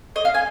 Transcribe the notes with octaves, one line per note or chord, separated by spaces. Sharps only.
D#5
F5
G#5